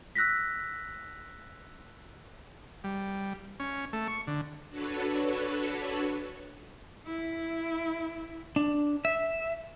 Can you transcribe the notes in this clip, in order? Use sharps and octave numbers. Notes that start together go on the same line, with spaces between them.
E6 F#6 A#6 B6
G3
C#4
A3
C#6
D3
D4 F#4 A4 B4 C#5
E4
D4
E5